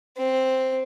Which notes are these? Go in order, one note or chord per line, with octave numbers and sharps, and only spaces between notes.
C4